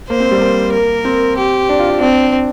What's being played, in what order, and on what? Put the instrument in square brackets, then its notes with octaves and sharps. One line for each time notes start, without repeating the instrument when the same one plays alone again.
[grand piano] A#3 [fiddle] C5
[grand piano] C4
G3
A#3
[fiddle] A#4
[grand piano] C4
[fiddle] G4
[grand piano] D4
F4
F4
[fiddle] C4 [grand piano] D4